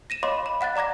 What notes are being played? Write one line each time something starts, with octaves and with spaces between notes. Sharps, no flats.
A#6 D#7 E7
C#5 D#5 F5 B5 C6 D6
B5
F5 F#5 F#6 A6
D5 A#5 D6 G#6 A#6